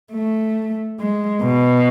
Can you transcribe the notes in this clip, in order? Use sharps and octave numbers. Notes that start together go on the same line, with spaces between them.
A3
G#3
B2